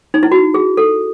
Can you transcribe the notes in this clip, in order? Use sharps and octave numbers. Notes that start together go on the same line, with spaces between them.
D#4
E4
F#4
G#4
A4